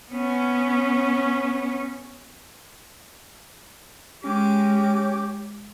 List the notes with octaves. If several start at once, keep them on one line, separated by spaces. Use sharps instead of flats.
B3 C#4
G#3 C#4 G4 D6